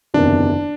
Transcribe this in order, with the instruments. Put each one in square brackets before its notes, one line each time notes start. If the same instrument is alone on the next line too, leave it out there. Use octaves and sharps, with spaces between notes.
[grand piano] F#1 E2 C3 D#3 [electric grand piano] D4